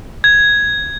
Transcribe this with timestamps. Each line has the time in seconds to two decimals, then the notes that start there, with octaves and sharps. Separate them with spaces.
0.24 G#6